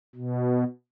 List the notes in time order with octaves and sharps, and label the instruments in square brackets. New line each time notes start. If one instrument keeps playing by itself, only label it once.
[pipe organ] B2